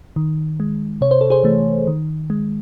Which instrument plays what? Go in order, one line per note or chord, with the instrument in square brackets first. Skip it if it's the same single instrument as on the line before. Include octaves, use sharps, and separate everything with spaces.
[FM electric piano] D#3
G#3
C3 C#5
C5
A4
G#4 C5
E3 A3
D#3
G#3